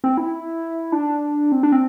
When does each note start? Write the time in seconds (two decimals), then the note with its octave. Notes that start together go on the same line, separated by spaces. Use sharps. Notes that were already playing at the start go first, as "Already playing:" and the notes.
0.04 C4
0.17 E4
0.92 D4
1.52 C4
1.63 D4
1.72 C4